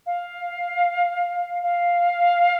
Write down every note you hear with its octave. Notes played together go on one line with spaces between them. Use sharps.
F5
F5